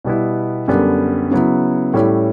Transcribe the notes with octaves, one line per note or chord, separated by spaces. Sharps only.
B2 G3 B3 E4
F#2 D3 G3 B3
C#3 F#3 B3 E4
A2 G3 C#4 E4